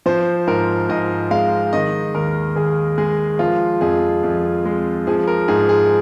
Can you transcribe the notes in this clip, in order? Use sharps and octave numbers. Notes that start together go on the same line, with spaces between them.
F3 C5
G#2 A#4
G#2 D#5
G#3 F5
D#3 D#5
D#2 A#4
D#2 G#4
G#3 G#4
F3 F4
F2 G#4
F2
G#3
F3 G#4
A#4
G#2 G#4
G#4